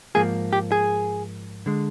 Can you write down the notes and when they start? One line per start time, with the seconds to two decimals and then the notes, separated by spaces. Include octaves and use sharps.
0.15 G#2 F3 A#3 G#4
0.53 G4
0.72 G#4
1.66 D3 G#3